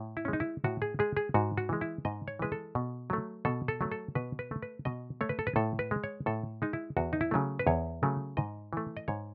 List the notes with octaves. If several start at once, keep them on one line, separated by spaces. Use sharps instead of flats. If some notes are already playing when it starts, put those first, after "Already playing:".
Already playing: A2
E4
C#4
G#3
D#4
E4
A2 F#4
G#4
G#3 G#4
G#4
G#2 F#4
F#4
E3 G#3
E4
G#2 D#5
C#5
E3 G#3 B4
A4
B2
F#3 A3
B2 A4
A4
F#3 A3
A4
B2 B4
B4
A3
B4
B2 D#5
A3 C#5
B4
A4
B4
A2 A4
B4
G#3
C#5
A2 A4
G#3 D#4
E4
E2 F#4
D#4
E4
C#3 F#3 A3
B4
E2 C#5
C#3 F#3 A3
G#2 D#5
E3 A3
D#5
G#2 C#5